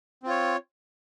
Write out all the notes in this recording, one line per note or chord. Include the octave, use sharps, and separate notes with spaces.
C4 F4 C#5